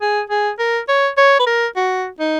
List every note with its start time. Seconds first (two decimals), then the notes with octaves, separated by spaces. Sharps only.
0.01 G#4
0.30 G#4
0.59 A#4
0.88 C#5
1.17 C#5
1.39 B4
1.47 A#4
1.76 F#4
2.19 D#4